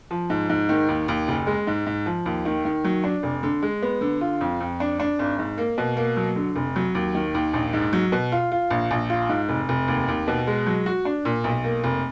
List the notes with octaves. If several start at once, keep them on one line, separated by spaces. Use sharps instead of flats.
F3
G#2
G#2
D#3
D#2
D#2
F#1
G#3
G#2
G#2
F3
D#2
D#3
D#3
F#3
D4
F1
D3
G#3
B3
D3
F4
F2
F2
D4
D4
G#1
G#2
A#3
B2
A#3
F#3
D3
F1
F#3
D#2
D#3
D#2
A#1
G#2
F#3
B2
F4
F4
A#1
A#1
F4
G#2
F1
F1
D#2
D#2
B2
G#3
F#3
F#4
D4
A#2
B1
A#3
F1